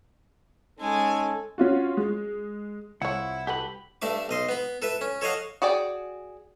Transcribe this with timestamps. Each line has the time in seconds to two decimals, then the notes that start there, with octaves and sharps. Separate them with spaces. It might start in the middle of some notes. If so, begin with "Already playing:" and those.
0.80 G#3 C#4 D#4 A4 G#5
1.58 C#4 F4 F#4
1.97 G#3
3.02 C2 E4 F4 C#5 F#5
3.47 F#4 G4 A4 B4 B5
4.02 G2 A3 E5 D6
4.29 B1 D#5 C6
4.49 B3 B5
4.82 A4 B4 E5
5.01 C#4
5.21 A4 C#5 D#5 F5 F#5
5.62 F#4 G#4 D5 G5